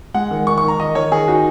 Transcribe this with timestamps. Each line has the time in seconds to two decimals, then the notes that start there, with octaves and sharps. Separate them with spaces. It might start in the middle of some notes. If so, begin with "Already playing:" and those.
0.14 G#3 F#5
0.31 D#3
0.47 D#3 C#6
0.58 C#6
0.63 D#3 A#5
0.80 D#3 D#5
0.95 D#3 C#5
1.12 D#3 G#4
1.28 D#4 F#4